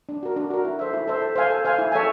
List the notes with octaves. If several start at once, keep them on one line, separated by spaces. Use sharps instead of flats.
D4
F#4 A#4
D4
F#4 A#4
E4
A4 C5 E5
E4
A4 C5 E5
A4
C5 F5 G#5
A4
C5 F5 G#5
E4
A4 C#5 E5 G#5